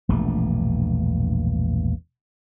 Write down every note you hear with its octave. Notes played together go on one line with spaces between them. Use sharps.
E1 A#1 G2 A3